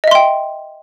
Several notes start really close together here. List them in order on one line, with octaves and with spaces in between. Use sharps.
D#5 E5 C6 G5